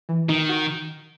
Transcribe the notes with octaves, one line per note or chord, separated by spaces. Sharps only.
E3
D#3 D#4
F#4